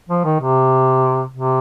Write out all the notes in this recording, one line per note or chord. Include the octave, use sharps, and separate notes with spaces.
F3
D#3
C3
C3